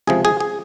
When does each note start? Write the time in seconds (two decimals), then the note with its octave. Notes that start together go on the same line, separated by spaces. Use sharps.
0.07 C#2 C3 F3 G#4
0.25 G#4
0.40 G#4